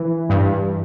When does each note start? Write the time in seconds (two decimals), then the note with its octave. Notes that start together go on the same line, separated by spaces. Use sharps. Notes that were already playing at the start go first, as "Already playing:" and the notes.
Already playing: E3
0.29 G2